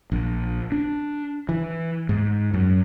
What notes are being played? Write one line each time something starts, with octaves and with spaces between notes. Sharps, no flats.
A#1
D4
E3
G#2
F#2